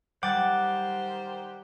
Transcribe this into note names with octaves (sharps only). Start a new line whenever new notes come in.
D#3 G3 G4 C5 F#5 G5 D6 A6